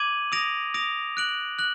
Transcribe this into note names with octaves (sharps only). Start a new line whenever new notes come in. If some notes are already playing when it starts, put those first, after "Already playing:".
Already playing: D6 G#6 D#7 F#7
D#6 A#6 D7 F7
D#6 A#6 D7 F7
F#6 D7 F#7
F#6 F#7